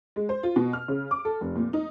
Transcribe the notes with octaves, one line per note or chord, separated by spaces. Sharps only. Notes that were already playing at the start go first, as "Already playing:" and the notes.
G#3
C5
F4
B2
F6
C#3
D6
A4
F1
A#2
D#4